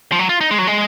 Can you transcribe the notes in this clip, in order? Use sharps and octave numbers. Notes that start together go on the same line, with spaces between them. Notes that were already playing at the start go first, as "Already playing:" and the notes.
F3
F#3
F4
D#4
G#3
F#3
G#3